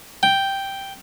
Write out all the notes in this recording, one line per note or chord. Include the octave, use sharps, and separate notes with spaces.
G5